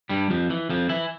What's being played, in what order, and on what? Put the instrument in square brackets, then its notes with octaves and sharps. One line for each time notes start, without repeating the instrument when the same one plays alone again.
[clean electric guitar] G2 G3
F2 F3
E3
F2 F3
E3 E4